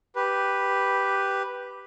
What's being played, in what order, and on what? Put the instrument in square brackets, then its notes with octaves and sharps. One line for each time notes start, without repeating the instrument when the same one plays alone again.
[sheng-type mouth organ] G4 B4